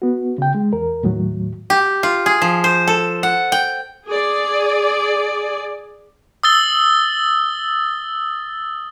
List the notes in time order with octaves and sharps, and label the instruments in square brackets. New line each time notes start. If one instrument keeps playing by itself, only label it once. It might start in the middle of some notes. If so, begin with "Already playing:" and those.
[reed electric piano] B3 F#4
C#3 G5
G#3
E2 A#4
D#2 A2 F#3
[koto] G4
F4
G#4
F3
C5
A4
F#5
G5
[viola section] G#4 D5
[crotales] D#6 E6 A6 G7